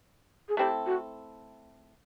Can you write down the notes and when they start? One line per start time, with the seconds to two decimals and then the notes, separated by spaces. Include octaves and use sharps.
0.49 G#4
0.57 A3 C4 E4 G4 A4
0.86 F#4